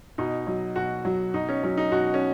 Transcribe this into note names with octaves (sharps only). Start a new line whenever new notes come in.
B2 D#4
F#3
B2 F#4
F#3
B2 D#4
C#4
F#3 C#4
D#4
B2 F#4
C#4